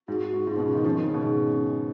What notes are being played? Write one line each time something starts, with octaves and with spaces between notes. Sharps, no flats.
G#2 F#4
F#4
G#2
G#2 F4
B2
C#3 F4
D#3
F3 C#4
D#3
C#3
B2
G#2